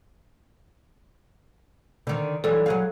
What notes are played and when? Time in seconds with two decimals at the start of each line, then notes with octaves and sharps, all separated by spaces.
2.07 D3 D#3
2.44 E3 F#3 G3 A4
2.66 F#3 G#4 F5